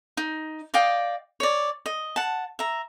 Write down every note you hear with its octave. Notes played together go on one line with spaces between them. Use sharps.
D#4
D5 D#5 F5 G5
C#5 D5
D#5
F#5 A5
E5 A#5